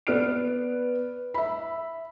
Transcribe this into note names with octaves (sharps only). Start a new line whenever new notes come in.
B3 B4 D5 F6 D7
E5 B5